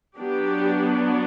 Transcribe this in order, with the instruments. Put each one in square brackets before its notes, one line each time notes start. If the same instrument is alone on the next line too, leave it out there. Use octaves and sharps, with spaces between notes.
[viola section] F#3 B3 D4 G4